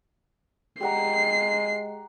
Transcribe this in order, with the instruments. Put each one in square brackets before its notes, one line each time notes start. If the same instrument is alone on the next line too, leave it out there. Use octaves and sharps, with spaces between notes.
[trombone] G#3 [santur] G4 F#5 A#5 [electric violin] C7